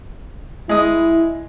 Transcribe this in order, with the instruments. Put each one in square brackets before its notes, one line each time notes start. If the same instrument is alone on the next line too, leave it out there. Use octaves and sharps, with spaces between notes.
[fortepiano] G#3 D#6 [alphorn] E4